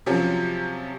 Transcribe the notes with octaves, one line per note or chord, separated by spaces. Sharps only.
C3 F3 F#3 C#4